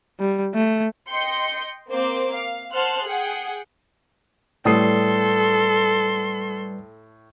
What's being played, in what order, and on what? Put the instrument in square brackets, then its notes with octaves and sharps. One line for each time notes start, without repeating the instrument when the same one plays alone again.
[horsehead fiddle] G3
A3
[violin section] D#5 G5 C6 G6 C#7
A#3 C4 C5 D6
F5
C5 F#5 A5 C6 F6 F#6
G#4 F#5 G5
[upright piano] A2 D#6 C7 [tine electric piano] G3 B4 D5 [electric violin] A4 C6